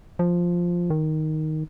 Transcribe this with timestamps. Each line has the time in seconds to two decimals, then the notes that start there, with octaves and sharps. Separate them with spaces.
0.19 F3
0.90 D#3